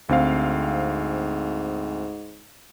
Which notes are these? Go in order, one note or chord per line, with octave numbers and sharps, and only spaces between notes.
D2 G#2 C4 F5